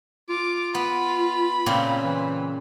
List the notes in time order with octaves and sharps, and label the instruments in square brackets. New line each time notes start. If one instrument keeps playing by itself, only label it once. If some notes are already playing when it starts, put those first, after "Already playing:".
[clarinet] F4 [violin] D6
[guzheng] B3 [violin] B5
[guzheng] A#2 C#3 C4
[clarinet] E3